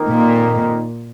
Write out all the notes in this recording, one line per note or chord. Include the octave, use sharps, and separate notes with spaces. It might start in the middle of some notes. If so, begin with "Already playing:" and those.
Already playing: F2 D#3 A#3 D#4 A#4
A#2